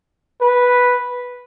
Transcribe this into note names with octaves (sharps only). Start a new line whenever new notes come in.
B4